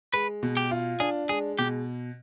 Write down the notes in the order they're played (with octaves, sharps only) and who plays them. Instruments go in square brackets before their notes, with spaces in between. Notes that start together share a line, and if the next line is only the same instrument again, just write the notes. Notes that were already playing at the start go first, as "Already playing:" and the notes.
[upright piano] G#3 [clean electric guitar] B4
[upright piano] B2
[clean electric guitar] G4
[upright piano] F4
[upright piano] D4 [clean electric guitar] G#4
[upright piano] G#3 [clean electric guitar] G#4
[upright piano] B2 [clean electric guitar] G4